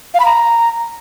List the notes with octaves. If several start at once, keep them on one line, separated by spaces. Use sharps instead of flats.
F5
B5
A#5